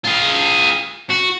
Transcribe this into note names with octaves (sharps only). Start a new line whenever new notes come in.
F4 G#4
F#4